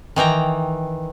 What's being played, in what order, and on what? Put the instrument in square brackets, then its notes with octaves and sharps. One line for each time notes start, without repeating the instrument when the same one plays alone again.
[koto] D#3 E3 G5 A#5